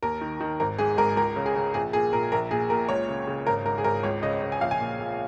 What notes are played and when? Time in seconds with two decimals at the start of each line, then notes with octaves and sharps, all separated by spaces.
0.03 D#2 A#4
0.21 D#3
0.40 D#3
0.60 G#1 A#4
0.78 G#2 G#4
0.97 G#1 A#4
1.17 C#2 A#4
1.36 C#3
1.46 G#4
1.56 C#3
1.74 A#1 G#4
1.93 A#2 G#4
2.13 A#2 A#4
2.32 A#1 A#4
2.51 A#2 G#4
2.70 A#2 A#4
2.89 C#2 C#5
3.09 C#3
3.27 C#3
3.47 G#1 A#4
3.66 G#2 A#4
3.78 G#4
3.84 G#1 A#4
4.03 C#2 C#5
4.23 C#3 D#5
4.42 C#3
4.52 G#5
4.61 A#1 F5
4.71 G#5
4.80 A#2
4.99 A#2